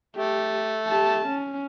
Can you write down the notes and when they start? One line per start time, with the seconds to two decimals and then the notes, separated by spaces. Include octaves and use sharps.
0.16 A3 G4
0.88 G4 A5
1.27 C#4